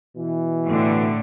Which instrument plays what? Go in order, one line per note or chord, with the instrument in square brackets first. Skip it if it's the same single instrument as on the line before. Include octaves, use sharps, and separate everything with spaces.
[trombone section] B2 E3
[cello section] A2 D3